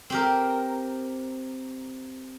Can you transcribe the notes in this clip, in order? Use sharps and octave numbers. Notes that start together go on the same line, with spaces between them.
C4 G4 A#4